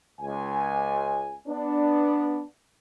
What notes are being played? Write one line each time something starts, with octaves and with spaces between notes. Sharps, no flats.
C#2 G#5
B3 D4